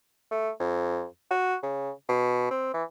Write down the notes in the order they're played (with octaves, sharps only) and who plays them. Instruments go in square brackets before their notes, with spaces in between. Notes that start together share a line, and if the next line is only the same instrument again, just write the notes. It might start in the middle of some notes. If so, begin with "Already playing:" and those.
[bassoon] A3
F2
F#4
C#3
B2
C4
E3